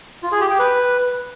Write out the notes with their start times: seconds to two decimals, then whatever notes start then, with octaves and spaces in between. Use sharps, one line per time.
0.23 F4
0.32 G#4
0.41 G4
0.50 G5
0.59 B4